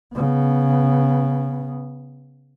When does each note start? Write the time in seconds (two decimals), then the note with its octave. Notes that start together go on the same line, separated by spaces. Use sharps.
0.14 C#3 B3